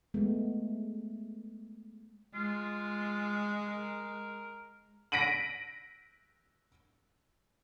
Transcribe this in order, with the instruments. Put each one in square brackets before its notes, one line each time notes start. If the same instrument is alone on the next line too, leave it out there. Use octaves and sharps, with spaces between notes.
[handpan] G#3 A3 B3
[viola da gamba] G#3 [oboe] F4
[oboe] A#4
[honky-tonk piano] A#6 B6 D7 D#7 F#7